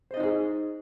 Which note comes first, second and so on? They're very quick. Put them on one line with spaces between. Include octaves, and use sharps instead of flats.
C5 D#5 D#4 F#4 G#4